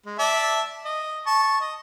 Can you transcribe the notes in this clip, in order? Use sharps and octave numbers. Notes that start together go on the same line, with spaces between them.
G#3
D5 E5 A5
D#5
A5 C#6
D#5